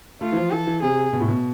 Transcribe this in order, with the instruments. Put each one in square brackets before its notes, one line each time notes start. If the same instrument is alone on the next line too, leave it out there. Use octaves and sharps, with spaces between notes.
[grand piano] A3 [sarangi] F4
[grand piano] E3
F3
[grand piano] E3 [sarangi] A4
[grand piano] E3
[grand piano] C3 [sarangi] G#4
[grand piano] B2
A2
B2